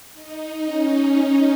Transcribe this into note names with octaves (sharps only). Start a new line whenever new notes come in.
D#4
C#4